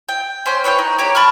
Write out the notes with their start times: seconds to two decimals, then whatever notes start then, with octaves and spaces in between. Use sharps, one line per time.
0.09 G5
0.46 C#4 C5 G5
0.64 B4 C#5 E5 G5
0.78 D#4
0.99 A#3 G4 C#5
1.15 A5 B5 C#6 F6